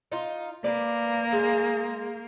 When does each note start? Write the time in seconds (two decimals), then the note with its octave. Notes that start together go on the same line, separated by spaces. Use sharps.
0.12 D#4 F4
0.64 A#3 B4 D5
1.32 G#3